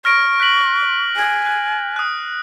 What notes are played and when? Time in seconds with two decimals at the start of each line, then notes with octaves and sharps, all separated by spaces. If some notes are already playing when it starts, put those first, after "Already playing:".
0.05 C#6 F6 A#6 D7
0.40 F#6 B6 F#7
1.16 G#5
1.46 F#6
1.96 D#6 F#6